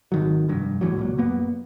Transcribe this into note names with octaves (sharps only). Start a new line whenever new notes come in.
G#1 D#3 F#3
F1 G2
E2 A2 E3 F#3
C#2 A#2 F#3
F#2 A#3 B3